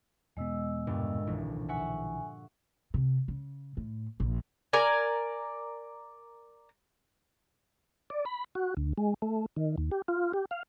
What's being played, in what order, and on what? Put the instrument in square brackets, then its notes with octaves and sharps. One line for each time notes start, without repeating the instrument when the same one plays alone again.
[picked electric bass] E2 B2 B3 [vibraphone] G#3 D#5 E6
[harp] D2 G2 A#2
[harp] F1 [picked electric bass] B1 D#3 E3
[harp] E5 F#5 C#6 [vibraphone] G#5
[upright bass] C3
C#3
A2
A#1
[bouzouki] A#4 D5 G#5
[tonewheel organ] D5
B5
F#4
D2
G#3
A3
D#3
D#2
G4
F4
G4
F5